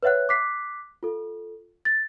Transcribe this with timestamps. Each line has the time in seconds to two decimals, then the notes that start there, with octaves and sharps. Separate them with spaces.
0.03 B4 C#5 E5 F#5 F#6
0.29 D6 F#6 B6 C7
1.03 F4 A4
1.85 A6